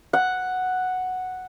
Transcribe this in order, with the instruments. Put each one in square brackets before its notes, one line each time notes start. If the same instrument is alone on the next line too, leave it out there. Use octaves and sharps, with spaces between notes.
[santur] F#5